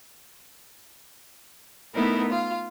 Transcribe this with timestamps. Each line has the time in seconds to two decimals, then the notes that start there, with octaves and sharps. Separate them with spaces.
1.95 A3 B3 D#4 E4 A#4
2.30 F4 F5